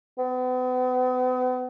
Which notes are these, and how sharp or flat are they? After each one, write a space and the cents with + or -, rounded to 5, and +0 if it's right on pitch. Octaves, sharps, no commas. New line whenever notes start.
B3 +40